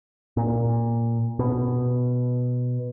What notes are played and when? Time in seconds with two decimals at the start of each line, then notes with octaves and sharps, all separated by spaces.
0.37 A#2
1.39 B2